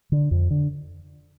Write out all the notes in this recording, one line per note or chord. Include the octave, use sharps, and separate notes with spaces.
D3
F2
D3